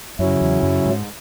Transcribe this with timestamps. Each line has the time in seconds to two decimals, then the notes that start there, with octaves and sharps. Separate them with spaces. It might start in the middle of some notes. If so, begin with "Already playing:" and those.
0.19 F#2 C#3 F#3 C#4 E4
0.41 E2
0.63 F#2
0.86 G#2